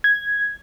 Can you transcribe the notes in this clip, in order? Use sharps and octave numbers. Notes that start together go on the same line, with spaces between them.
G#6